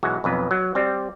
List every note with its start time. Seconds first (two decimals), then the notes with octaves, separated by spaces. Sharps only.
0.03 B1 E3 G#3 F#4
0.24 B1 F2 B4
0.51 F#3
0.75 G3 C4